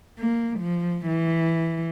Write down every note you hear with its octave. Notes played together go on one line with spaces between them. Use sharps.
A#3
F3
E3